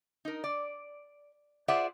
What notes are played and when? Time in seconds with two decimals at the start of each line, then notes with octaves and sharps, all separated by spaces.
0.25 D#4 A#4
0.44 D5
1.68 F4 G#4 C5 D5 E5 F#5